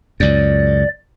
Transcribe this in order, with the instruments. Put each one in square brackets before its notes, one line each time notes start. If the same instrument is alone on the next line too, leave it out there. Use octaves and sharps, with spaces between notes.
[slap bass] C#2 F#2 [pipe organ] D5